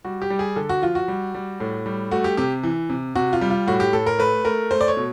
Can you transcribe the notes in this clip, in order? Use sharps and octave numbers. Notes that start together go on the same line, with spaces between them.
G3 F#4
G4
G3
G#4
D3 A4
F#4
F3 F4
F#4
G3
G3
A2
G3
A3 F#4
G4
C3 G4
E3
C3
C3 F#4
F4
G3
F4
A2 F#4
G4
A2 A4
A#4
A3 B4
A3 A#4
A3 C5
D5
C#5
B2